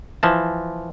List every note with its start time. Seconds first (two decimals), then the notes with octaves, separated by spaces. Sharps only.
0.23 E3 F3 A5